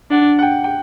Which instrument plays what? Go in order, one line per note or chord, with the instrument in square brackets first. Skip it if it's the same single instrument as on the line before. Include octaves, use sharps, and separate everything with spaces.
[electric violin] D4 [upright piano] F#5
[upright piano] F#5
G5
G5